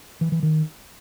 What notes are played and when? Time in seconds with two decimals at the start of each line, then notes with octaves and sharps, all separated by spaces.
0.21 E3
0.32 E3
0.43 D#3